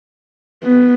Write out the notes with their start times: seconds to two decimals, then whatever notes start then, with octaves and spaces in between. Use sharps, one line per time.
0.64 B3